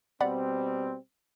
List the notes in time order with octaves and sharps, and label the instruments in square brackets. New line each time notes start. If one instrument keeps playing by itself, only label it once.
[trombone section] B2 G3 C4 [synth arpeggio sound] D5 F#5 B5